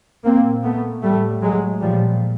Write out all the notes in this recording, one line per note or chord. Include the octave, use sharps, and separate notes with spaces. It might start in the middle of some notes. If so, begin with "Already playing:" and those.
A#2 A#3 C4
A3 B3
A2 G3 A3
F#3 G#3
A#2 F3 G3